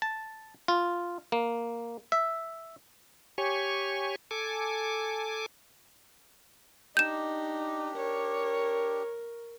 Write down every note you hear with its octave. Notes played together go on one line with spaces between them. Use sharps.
A5
F4
A#3
E5
G4 C#5 G#5 C#6
A4 G#5 D6
D4 D#4 G4 G6 E7
A#4 C#5